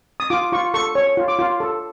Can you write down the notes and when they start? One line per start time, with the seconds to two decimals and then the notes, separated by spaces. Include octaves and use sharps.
0.20 D#6
0.30 F4 D6
0.52 F4 C#6
0.74 A4 C#6
0.95 C#5
1.17 F4
1.28 D6
1.39 F4
1.60 A4